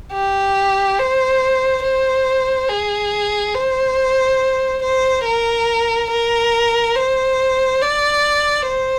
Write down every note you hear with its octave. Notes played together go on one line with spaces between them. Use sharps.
G4
C5
C5
G#4
C5
C5
A#4
A#4
C5
D5
C5